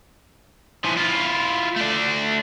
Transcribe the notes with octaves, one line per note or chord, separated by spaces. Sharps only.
E3 F3
E4 F4
A3 D4